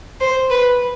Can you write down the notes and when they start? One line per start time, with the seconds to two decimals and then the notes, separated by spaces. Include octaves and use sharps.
0.21 C5
0.50 B4